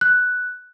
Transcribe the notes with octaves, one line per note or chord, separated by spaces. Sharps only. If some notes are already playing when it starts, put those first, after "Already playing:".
F#6